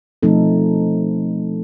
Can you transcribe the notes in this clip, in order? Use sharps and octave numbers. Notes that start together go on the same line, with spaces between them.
B2 F3 A3 C4 D#4 A4